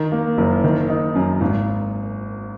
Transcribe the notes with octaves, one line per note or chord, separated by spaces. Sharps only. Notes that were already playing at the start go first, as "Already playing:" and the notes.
Already playing: D#3
A#3
F#1
D#3
D#4
F#2
G#1